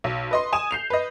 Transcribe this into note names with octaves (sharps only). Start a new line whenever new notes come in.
B1
B4 D#5 C6
G#5 D#6 E7
G6 C7 F7
B4 D#5